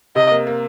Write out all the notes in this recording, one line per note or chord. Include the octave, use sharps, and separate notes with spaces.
C3 D#5
A#3
A#3